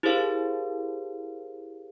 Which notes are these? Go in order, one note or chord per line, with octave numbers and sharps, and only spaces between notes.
E4 G4 G#4 A#4 C5 F5